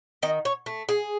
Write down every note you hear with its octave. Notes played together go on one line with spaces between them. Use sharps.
D#3 D#5
C#5
A3
G#4